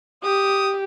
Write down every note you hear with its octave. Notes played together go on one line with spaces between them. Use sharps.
G4 D#6